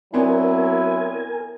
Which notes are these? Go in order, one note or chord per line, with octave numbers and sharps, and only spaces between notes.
F#3 B3 C4 D4 E4 A#4 G#5